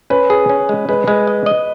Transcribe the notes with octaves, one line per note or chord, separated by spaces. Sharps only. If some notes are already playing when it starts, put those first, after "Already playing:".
C#4 B4
G#4
C#4
G#3
G#3 B4
G#3 B4
D#5
D#5